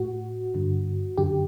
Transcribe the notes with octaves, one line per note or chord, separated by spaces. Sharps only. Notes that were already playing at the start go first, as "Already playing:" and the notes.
Already playing: A2 F#4
G2 D3
F#2 D3 G4